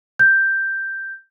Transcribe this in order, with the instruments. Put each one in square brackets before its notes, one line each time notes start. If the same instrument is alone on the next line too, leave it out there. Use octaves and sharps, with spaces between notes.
[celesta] G6